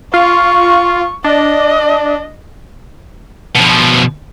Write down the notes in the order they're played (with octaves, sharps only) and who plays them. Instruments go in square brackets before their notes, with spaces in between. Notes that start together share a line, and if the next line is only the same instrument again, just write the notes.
[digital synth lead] F4 [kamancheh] C#6
[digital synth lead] D4 [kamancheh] D#5
[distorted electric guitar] B2 F3